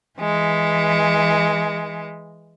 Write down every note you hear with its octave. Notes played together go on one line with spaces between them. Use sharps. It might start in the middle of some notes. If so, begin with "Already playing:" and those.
E3 G#3